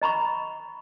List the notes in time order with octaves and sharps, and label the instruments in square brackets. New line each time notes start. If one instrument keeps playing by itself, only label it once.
[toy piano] D#5 A#5 B5 C#6